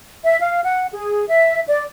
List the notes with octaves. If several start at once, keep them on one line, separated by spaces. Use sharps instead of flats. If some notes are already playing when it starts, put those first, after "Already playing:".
E5
F5
F#5
G#4
E5
D5